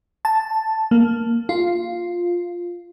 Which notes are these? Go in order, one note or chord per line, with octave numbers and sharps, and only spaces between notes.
A5
A#3
F4